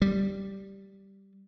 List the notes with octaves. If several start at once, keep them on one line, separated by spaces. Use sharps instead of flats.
G3